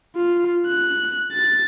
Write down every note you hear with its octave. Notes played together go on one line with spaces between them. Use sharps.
F4
F#6
A6